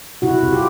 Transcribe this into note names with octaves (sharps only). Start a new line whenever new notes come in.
C3 E4 F#4
C3
F4 G4